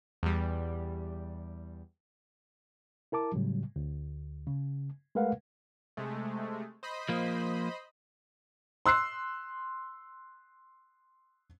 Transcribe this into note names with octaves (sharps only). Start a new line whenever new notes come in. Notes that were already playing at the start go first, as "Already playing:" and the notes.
E2 G3
E4 A#4 A5 D6
A2 C#3 F#3 G3
D2
C#3
G#3 A3 A#4 B4 F5 F#5
C3 G#3 A3
C5 D#5 B5
F3 A#3
C6 E6 F#6 C7